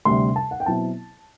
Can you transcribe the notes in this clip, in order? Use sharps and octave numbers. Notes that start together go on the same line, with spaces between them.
D2 C3 G3 C6
A5
F#5
G5
B2 F#3 C4 E4 A5